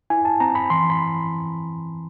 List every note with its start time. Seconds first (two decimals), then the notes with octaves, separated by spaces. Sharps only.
0.10 E4 G#5
0.25 A5
0.40 C4 A#5
0.55 B5
0.70 E3 C6
0.90 B5